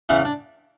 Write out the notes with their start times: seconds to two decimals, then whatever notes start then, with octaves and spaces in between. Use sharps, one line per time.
0.09 E2 C#3 E3 E4
0.25 D4